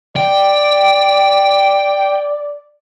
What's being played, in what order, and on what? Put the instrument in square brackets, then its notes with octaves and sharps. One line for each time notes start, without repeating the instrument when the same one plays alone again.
[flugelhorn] D5 [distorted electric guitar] G5